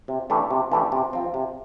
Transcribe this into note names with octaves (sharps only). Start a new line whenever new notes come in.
C3
E3 A3 D4 G4
C3
E3 A3 D4 G4
C3
F3 C4
C3